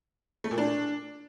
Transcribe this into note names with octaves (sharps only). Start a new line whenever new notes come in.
A3
A#2
D4